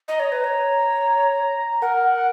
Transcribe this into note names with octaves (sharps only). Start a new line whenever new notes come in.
D#5 A#5
C#5
B4
C#5
A#4 F#5
F#5